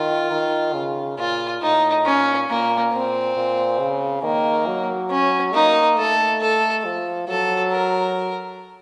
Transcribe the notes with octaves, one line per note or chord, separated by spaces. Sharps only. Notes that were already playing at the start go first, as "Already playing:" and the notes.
Already playing: D#3 F4
D#3
C#3
A#2 F4
A2 D#4
A#2 C#4
A#2 A#3
A#2 C4
A#2
C#3
D#3 A#3
F#3
C#4
A#3 D#4
A3 A4
A4
F3
F#3 A4
A#4